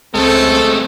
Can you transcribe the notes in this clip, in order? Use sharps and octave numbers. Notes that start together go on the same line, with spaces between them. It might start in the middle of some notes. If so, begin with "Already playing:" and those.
C#2 G#3 A3 C4 A4